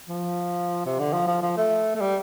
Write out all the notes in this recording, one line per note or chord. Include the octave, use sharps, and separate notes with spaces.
F3
C3
D3
F3
F3
F3
A3
A3
G3